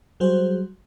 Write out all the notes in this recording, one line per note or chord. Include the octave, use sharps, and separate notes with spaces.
F#3 G3 F#4 G#4 C5